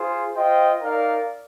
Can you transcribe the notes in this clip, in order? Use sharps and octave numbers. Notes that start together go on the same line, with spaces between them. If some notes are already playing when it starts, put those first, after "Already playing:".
Already playing: F4 G#4 C5
F4 C5 D#5 G5
D#4 A#4 D5 F5